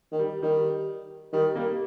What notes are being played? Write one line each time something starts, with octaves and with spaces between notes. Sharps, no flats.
D#3
G3
D#3 G3
D#3 G3
G3 A#3